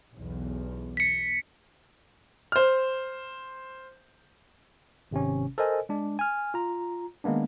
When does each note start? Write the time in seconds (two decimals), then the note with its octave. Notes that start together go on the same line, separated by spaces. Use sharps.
0.15 B1 E2
0.97 B6 C#7
2.52 C5 F6
5.11 G#1 C3 C#4
5.58 A4 A#4 C5 D#5 G#5
5.89 G#3 D4
6.19 G#5 F6
6.54 F4 A#5
7.24 D#3 G#3 A#3 B3 D4